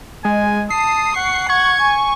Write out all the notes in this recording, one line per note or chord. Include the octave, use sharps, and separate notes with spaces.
G#3 G#5
A5 D#6 C7
F#5 C#6
F#5 C#6 G#6
G#5